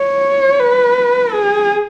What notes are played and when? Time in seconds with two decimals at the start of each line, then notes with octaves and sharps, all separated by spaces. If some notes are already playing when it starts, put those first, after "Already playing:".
Already playing: C#5
0.60 B4
1.32 G#4